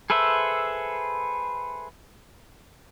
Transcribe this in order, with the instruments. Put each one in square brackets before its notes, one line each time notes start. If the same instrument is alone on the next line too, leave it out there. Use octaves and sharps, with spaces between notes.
[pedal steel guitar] G#4 A4 B4 C5 E5